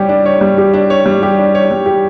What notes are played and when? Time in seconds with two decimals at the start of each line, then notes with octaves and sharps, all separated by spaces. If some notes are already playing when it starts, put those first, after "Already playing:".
Already playing: G3 G4 C#5
0.09 D4
0.26 C#5
0.41 G3
0.58 G4
0.74 D4
0.90 C#5
1.06 G3
1.23 G4
1.39 D4
1.55 C#5
1.71 G3
1.86 G4